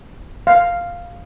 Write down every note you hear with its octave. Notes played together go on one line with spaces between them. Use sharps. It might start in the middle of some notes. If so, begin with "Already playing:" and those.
F5